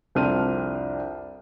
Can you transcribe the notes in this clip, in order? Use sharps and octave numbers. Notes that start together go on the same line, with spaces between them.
C2 F2 C4 D4 F6 D#7